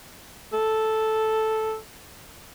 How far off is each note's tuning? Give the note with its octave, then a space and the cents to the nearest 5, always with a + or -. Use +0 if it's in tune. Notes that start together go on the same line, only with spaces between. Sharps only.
A4 -5